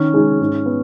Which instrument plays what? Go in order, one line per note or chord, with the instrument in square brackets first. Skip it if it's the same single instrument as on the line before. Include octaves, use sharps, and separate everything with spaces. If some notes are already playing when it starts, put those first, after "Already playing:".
Already playing: [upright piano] D#3 [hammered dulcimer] C#4
[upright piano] G#3 D#4 G#4
G#2
B3